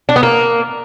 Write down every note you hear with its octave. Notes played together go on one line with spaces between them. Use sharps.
D4
B3
A#3